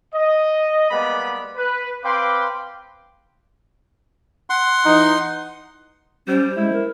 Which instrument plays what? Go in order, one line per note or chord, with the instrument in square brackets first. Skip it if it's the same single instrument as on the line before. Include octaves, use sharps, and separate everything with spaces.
[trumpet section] D#5
G3 G#3 A#3 B3 D5 B5
B4
C4 B4 F5 G5 C6 D6
[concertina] F#5 C6
[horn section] E3 D#4
[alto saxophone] G3 [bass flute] C#4 [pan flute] C5
[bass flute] G#3 [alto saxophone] E4
[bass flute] A#4